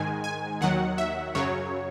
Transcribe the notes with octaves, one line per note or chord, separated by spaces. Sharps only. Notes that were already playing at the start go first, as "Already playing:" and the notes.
Already playing: G#2 D#3 G#3 G#5
G#5
D#2 D#3 F#3 F#5
E5
F#2 C#3 F#3 C#5